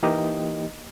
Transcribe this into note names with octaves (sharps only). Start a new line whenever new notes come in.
E3 A#3 D#4 G4 D#5